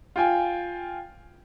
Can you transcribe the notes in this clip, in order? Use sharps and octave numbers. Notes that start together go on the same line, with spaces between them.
F4 G5 G#5